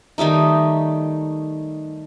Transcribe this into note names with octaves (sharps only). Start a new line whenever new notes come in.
D#3 G3 A3 D#4